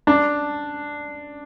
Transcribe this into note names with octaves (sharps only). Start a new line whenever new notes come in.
D4